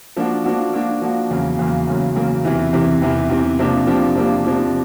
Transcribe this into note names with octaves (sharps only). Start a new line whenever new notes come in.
F3 A#3 D4 F#4
F3 A#3 D4 F#4
F3 A#3 D4 F#4
F3 A#3 D4 F#4
E2 C#3 F#3 A#3
E2 C#3 F#3 A#3
E2 C#3 F#3 A#3
E2 C#3 F#3 A#3
E2 C3 E3
E2 C3 E3
E2 C3 E3
E2 C3 E3
C3 F3 A#3 D4 G4
C3 F3 A#3 D4 G4
C3 F3 A#3 D4 G4
C3 F3 A#3 D4 G4